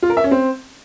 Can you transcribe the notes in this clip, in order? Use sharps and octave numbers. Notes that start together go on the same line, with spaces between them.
F4
A#4
E5
C#4
C4